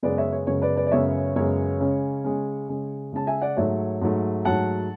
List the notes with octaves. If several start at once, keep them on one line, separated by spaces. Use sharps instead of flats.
F#2 C#3 G#3 B3 B4 D5
C#5 E5
C#5
F#2 C#3 G#3 B3 C#5
B4 D5
B4 D5
D5
F#2 C#3 G#3 B3 C#5 E5
F#2 C#3 G#3 B3 C#5
C#3 G#3 C#4
C#3 G#3 C#4
C#3 G#3 C#4
C#3 G#3 C#4 A5
E5 G#5
D5 F#5
G#2 F#3 A3 C#5 E5
G#2 F#3 A3
G#2 F#3 A3 F#5 A5